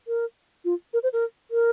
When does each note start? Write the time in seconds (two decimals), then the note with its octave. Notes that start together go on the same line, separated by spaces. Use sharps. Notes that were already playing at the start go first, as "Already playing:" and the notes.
0.08 A#4
0.65 F4
0.93 A#4
1.03 C5
1.13 A#4
1.51 A#4